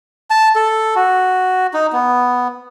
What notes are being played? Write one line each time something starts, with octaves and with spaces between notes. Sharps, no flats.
A5
A4
F#4
D#4
B3